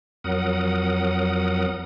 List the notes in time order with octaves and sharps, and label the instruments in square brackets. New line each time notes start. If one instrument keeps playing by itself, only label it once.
[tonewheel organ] F2 F#3 A#4 F#5 D#6